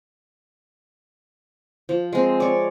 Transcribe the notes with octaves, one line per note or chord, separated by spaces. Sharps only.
F3
G#3 C4
C#5 D5